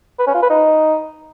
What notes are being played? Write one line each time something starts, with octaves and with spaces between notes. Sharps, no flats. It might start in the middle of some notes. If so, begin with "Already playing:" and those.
B4
C#4
F4
B4
D#4